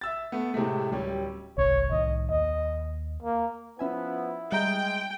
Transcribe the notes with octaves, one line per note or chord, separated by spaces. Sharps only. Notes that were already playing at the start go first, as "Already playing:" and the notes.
E5 E6 A6
A3 B3
A2 C3 G#3 A3
D1 G3 C#4
G1 C2 C#5
C2 A2 D#3 D#5
D#2 D#5
A#3
F3 B3 C#4 E4 E5 G#5
G3 G#3 E5 G5 A#5